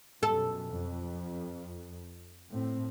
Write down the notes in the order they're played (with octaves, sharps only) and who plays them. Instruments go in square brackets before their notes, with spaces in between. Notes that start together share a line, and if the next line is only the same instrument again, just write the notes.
[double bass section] F#2 B2 [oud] A4
[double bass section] F2
A2 C4